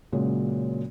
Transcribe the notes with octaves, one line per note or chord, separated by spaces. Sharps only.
A#2 C#3 F#3 G#3